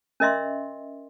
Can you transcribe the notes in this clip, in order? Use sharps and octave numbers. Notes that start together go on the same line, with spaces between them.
C#4 A#4 D#5 E5 C6